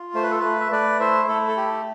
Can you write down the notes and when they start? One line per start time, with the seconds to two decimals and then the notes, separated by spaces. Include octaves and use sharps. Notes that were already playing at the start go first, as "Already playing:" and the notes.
Already playing: F4
0.14 A3 C5
0.23 B4
0.31 A4
0.40 A3 B4
0.60 E5
0.72 A3 B4 D5
1.00 E4 C5 E5
1.28 A3 A4
1.48 A4
1.57 G4